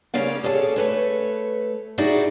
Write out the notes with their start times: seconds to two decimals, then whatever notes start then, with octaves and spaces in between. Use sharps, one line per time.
0.14 C#3 A#3 C#4 G#4 D5 F5
0.44 G#4 A4 C#5 D5
0.76 A3 B4 C#5
1.98 D#4 E4 F#4 G#4 D5